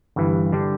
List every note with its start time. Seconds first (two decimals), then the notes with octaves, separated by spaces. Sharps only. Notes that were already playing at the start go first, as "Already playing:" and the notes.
0.16 G1 G2 E3
0.52 D3 G3 D4